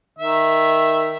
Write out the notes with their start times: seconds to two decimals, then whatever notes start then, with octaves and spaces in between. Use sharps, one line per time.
0.19 D#3 E5